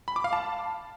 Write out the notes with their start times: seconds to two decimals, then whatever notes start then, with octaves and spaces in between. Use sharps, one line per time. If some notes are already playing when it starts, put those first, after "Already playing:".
0.08 B5
0.16 D6
0.24 F5
0.33 A5